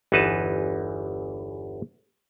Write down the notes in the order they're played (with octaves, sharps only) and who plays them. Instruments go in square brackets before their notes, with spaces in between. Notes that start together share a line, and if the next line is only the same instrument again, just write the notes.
[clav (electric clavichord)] G1 E2 E3 D#4 B4 A5